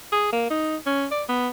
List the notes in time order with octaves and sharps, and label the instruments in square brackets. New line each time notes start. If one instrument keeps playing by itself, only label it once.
[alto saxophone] G#4
A#3
D#4
C#4
D5
B3